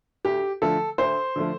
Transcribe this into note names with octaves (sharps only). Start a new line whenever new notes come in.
D2 G4
D3 F3 A3 A4
D2 C5
D3 F3 A3